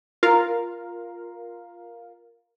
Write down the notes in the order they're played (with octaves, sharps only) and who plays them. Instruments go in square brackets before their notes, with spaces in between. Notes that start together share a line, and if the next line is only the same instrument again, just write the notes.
[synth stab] F4 A#4 F5